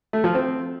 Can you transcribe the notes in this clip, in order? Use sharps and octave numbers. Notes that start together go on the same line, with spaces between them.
A3
F3
C4